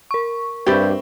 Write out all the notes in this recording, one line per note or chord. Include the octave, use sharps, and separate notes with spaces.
A#4 C#6
G2 C4 G4 D5 E5 B5